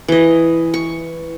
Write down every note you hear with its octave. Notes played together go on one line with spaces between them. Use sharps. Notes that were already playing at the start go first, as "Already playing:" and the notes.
E3 D#5
C#6